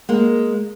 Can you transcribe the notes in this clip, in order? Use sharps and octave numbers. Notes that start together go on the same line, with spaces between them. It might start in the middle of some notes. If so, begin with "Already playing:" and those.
G#3 A#3